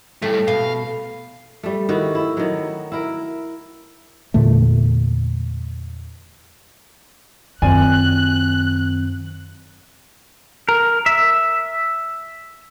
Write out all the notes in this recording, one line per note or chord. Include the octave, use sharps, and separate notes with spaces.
A2 G3 A3
B2 F5
G3 A3
D#3 E4 F#4
E4
D#3 F#3
E4 A#4
E2 A#2 D3 A3
F#2 D#3 C4 F4 D5 G#5 F#6
A#4
E5